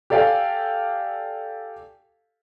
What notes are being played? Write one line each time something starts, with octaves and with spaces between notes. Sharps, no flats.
G4 A4 D5 F5 G5 G#5